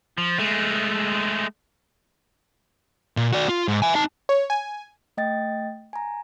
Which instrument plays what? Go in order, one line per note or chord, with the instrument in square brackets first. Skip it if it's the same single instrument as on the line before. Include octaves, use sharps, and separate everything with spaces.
[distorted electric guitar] F3
G#3 A3
[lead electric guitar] A#2
F#4 D5
F4
G#2
E5 G#5
D#4 A5
[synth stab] C#5
G#5
[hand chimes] A3 D#5 G5 A6
G#5 A#5